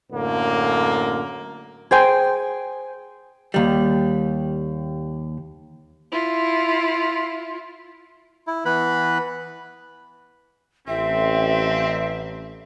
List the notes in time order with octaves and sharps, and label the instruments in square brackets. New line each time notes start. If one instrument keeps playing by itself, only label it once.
[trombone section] F#2 A2 D3 A#3
[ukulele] G#4 C5 G5 G#5
[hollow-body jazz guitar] D#2 G3
[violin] E4 F4
[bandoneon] E4
E3 B3 B4 B5
[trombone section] A1 [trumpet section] C4 [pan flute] E5